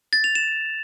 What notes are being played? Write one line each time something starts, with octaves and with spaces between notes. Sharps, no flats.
A6
F7
E7